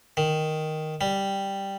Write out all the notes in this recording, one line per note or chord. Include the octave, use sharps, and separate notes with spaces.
D#3
G3